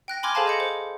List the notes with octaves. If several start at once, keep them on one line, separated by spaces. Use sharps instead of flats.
G5 F#6 A#6
G#5 B5 C6 D6 F6 G#6
G#4 A4 C5 F5 G#5 A5
D#5 G6 C#7
C5